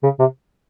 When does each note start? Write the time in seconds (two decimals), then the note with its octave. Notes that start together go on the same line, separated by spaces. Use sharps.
0.03 C#3
0.19 C3